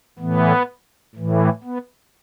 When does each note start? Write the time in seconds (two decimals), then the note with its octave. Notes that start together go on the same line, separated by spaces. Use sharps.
0.19 A2 E3 B3
1.15 A2 E3
1.64 B3